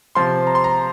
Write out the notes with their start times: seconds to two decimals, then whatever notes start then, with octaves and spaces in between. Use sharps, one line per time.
0.15 C3 F3 C6
0.47 A#5
0.55 C6
0.64 A#5